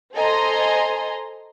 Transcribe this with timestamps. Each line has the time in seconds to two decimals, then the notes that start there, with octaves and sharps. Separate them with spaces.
0.14 A4 C5 D#5 G#5 A#5 C6